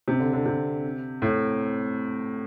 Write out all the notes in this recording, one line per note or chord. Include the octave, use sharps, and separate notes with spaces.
C3
D3
D3
C3
A2